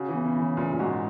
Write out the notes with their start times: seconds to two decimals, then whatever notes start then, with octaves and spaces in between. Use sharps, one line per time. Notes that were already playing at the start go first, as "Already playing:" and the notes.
Already playing: C#3 F#4
0.08 E3
0.14 B3
0.26 C#3
0.36 E3
0.41 C#3
0.57 A#2 C#3
0.73 A#2
0.79 G#2 F#4